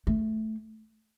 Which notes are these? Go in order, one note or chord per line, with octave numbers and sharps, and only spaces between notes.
A3